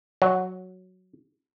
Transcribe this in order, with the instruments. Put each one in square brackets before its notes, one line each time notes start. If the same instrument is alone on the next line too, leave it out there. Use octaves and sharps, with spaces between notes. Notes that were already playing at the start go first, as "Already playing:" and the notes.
[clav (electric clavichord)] F#3